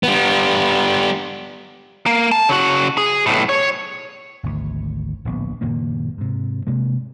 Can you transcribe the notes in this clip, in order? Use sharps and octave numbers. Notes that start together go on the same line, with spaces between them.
G3 B3
A#3
A5
C#3 F#4
G#4
B1 A2
C#5
G#1 D2
D1 A#1 B3
F#1 A#2 D#3 A#3
G#2 C3
C3 G#3 A#3